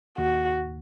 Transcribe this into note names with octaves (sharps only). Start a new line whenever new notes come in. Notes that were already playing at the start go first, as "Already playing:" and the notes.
D#2 F#4